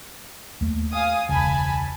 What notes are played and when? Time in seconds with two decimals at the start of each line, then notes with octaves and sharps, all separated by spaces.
0.61 D#2 A3
0.93 F5 G#5 D#6
1.29 E1 C#2 C#3 G#5 A5 B5